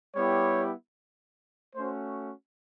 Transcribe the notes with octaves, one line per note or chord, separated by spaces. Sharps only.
G3 B3 E4 G4 C#5
A3 C#4 F#4 C5